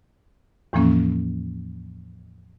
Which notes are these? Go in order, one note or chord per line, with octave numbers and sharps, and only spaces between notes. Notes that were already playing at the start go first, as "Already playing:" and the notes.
E2 A2 E3 F3 A#3 C#4